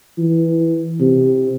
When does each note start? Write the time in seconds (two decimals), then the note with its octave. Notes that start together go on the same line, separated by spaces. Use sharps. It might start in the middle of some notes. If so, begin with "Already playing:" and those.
0.18 E3
1.00 C3